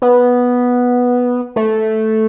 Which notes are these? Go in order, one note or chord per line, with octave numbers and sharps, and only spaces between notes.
B3
A3